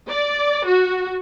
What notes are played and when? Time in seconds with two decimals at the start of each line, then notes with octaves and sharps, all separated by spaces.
0.10 D5
0.67 F#4